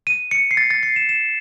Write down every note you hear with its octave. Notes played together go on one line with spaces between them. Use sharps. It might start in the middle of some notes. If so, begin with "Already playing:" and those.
D#7
C#7
C7
A6
A6
C7
E7
E7